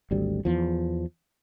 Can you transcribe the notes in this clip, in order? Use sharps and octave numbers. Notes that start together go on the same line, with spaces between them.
G#1 D2 G3
E2 F3